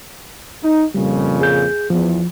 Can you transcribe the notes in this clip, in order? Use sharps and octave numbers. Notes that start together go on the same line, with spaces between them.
D#4
F2 A#2 C#3 G3
G#4 G6
E2 F3